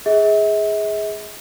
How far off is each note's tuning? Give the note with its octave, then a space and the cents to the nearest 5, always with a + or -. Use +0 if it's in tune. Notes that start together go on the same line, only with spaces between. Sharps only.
G#4 +0 E5 -45